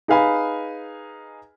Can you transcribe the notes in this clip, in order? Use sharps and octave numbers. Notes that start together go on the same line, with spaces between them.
D#4 G#4 B4 F5 G#5 B5